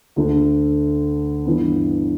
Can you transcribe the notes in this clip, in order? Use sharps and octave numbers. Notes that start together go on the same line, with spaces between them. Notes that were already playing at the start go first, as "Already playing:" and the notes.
D2 D3 A3
G2 E3 B3